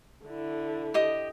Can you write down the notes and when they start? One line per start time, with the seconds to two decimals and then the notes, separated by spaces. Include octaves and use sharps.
0.25 D3 E4
0.94 G4 D#5 D#6